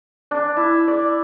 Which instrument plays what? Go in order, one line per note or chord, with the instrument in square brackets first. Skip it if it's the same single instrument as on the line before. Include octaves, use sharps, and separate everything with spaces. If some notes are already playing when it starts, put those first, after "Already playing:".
[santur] D4
E4
D5